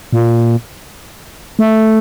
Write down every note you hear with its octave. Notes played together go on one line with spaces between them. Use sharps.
A#2
A3